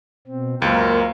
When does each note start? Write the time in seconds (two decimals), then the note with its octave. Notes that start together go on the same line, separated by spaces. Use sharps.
0.27 B2 C4
0.62 C#2 F#2 A#3 A#4 C5 F5